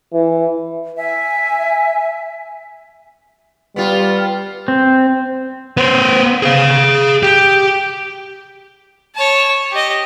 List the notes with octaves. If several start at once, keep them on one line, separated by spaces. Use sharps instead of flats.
E3
E5 G#5
G3 B3 F4
C4
B3 C5
G#4 F5
G4
C#5 A5
G4 D#5